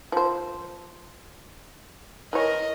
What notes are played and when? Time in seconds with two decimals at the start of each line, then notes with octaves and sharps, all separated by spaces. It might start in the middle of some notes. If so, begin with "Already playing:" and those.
0.12 F3 C5
2.33 E3 A#4 C#5 D#5